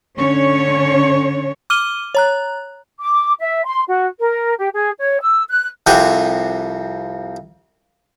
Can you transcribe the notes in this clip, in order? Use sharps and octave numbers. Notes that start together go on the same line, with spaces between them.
D3 C#4 C#5
D6 F6 D#7 G7
C#5 A#5 F#6
D6
E5
C6
F#4
A#4
G4
G#4
C#5
E6
F#6
C2 F2 C4 G4 F#5 G#5